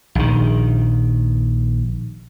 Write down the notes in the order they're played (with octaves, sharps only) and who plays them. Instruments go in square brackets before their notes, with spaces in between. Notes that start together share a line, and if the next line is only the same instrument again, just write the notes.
[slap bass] A#1 D#3